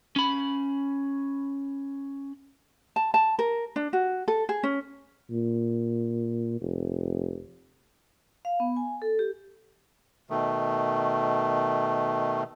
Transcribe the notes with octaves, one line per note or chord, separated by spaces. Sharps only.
C#4 B5
A5
A5
A#4
D4
F#4
A4
G#4
C#4
A#2
F1
F5
B3
G#5
A4
G4
B2 D#3 A3